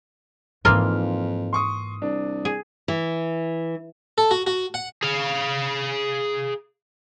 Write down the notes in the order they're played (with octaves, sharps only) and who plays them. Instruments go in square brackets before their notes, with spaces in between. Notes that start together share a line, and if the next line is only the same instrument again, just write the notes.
[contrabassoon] F2 [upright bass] G#2 D#4 [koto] E3 A#3 F4
[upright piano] C6 C#6 D#6
[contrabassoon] C2 [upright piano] D4
[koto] G#4
[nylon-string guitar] E3
[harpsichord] A4
F#4
F#4
F#5
[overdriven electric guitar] G#4 F5